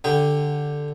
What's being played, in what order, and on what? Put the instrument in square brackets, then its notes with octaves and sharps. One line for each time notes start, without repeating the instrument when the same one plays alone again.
[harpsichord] D3 G4